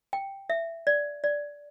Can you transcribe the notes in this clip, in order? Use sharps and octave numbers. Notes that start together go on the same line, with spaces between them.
G5
E5
D5
D5